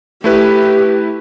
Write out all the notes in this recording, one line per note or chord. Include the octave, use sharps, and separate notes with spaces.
A3 E4 G4 B4